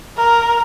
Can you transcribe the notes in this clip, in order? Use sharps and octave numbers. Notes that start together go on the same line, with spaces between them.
A#4